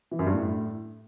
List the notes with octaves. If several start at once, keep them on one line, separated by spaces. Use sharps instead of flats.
E3
F#2
G2
A2